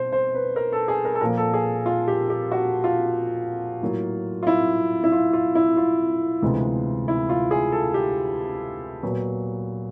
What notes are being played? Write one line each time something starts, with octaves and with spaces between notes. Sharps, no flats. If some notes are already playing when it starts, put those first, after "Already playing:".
Already playing: B2 C5
C5
B4
A#4
A4
G#4
A#4
A4
A#2 F3 A#3 A#4
A4
G#4
F4
G4
G4
F#4
F4
A2 F#3 A#3
F4
E4
E4
F4
F4
E4
F4
D2 C3 E3 G#3 B3
E4
F4
G#4
A4
G4
A#2 F#3 B3